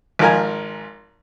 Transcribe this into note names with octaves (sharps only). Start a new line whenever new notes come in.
G#1 F3 A#4 G#5